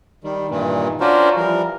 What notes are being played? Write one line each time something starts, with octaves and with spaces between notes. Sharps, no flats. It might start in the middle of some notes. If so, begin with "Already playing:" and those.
D#3 G3
G2 A#2 D#3 E3
C#4 D4 F4 F#4 A#4 C5
E3 F3 G3 A#4